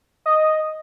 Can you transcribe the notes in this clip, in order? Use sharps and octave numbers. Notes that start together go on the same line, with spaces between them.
D#5